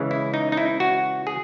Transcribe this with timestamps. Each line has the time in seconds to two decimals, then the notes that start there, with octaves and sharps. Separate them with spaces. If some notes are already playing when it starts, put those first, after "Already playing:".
Already playing: C#3 E3 G#3
0.11 E4
0.34 D#4
0.52 D#4
0.57 E4
0.80 F#4
1.27 G#4